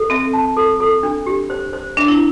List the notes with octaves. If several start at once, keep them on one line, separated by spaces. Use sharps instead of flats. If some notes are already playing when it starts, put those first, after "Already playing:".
Already playing: A4
C4 E5
A5
A4
A4
D4
G4
C5
C5
D4 E5
E4